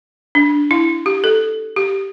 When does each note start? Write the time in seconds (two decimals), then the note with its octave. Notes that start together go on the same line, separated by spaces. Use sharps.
0.35 D4
0.71 E4
1.06 G4
1.24 A4
1.76 G4